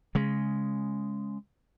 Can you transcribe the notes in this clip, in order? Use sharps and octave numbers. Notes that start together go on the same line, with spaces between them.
C#3 G#3